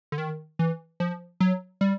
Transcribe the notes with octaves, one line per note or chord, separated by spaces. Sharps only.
D3
D#3
E3
F3
F#3
G3